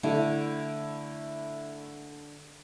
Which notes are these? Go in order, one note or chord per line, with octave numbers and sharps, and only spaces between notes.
D3 A3 E4